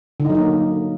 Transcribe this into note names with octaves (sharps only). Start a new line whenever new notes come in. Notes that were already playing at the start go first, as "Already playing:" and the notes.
D3
D#4
F#3
D#4
A#3